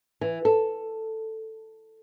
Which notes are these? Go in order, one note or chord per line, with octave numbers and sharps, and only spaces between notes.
E3
A4